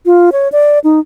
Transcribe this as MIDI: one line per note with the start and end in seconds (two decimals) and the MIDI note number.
0.06 0.30 65
0.32 0.48 73
0.52 0.79 74
0.84 1.00 63